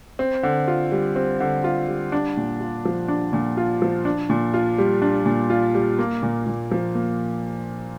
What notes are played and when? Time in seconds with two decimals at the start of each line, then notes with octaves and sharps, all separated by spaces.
0.19 C4
0.43 D3
0.68 F4
0.92 G3
1.16 C4
1.40 D3
1.64 F4
1.88 G3
2.12 D4
2.37 A#2
2.60 F4
2.85 F3
3.08 D4
3.33 A#2
3.57 F4
3.82 F3
4.05 D4
4.30 A#2
4.54 F4
4.78 G3
5.02 D4
5.26 A#2
5.50 F4
5.75 G3
5.99 A#3
6.23 A#2
6.47 A#2
6.71 F3
6.95 A#3